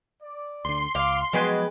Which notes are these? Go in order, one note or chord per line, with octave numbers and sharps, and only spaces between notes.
D5
D2 D3 C6
C#2 F5 D6
F3 F#3 G#3 B3 F#4 G#4 B4 G5